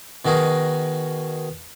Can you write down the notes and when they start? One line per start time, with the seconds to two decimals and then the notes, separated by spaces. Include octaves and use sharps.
0.25 B2 D#3 F#4 G#4 A#4